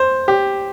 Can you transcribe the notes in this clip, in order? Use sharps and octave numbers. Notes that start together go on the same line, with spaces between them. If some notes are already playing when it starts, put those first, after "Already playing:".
Already playing: C5
G4